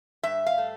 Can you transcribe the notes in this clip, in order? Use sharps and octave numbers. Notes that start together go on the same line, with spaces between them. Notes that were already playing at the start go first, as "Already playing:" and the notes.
G2 E5
F5
A3